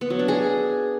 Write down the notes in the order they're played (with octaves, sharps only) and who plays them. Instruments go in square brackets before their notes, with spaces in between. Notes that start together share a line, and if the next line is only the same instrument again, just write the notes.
[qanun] B3
F#3
D4
G#4